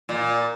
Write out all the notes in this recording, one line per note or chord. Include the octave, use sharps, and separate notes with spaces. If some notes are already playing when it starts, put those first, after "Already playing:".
A#2